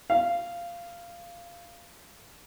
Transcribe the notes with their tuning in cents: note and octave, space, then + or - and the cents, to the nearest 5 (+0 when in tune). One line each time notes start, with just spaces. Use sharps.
F5 -15